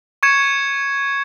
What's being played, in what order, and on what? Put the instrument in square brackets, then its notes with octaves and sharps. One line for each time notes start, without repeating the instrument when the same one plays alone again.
[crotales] C#6 G#6 C#7 E7